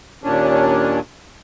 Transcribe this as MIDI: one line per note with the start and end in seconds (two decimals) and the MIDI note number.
0.24 1.00 39
0.24 1.00 46
0.24 1.00 61
0.24 1.00 62